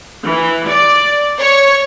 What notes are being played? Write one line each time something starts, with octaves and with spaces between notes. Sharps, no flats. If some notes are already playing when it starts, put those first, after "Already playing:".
E3
D5
C#5